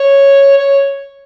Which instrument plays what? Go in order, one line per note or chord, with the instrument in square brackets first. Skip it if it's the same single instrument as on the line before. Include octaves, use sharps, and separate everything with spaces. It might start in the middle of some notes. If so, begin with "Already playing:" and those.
Already playing: [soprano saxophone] C#5
C#5